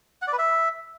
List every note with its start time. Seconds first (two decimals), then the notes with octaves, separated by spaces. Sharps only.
0.22 F#5
0.27 D5
0.33 B4
0.38 E5